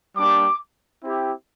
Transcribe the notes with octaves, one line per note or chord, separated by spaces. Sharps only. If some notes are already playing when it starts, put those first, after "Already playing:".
G3 A#3 D4 G4 D6
C4 E4 G4